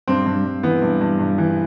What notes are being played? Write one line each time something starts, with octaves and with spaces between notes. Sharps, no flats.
G2 C4
G2
G2
E3 B3
G2
G2
G2
E3